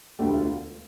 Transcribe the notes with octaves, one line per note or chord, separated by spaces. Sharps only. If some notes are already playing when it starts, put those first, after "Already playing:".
E1 D2 D3 A3 G4
F4